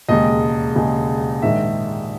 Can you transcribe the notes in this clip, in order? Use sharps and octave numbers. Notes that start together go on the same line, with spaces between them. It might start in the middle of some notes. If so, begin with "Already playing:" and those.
E1 D#2 C#3 G#3 D#5
E1 D#2 C#3 G#3
A#1 G#2 D#3 G#3 E5